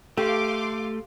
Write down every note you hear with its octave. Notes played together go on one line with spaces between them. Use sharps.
A3 G4 A4 F5 C6 D6